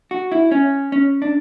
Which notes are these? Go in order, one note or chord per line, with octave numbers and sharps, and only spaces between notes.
F#4
E4
C#4
C#4
D4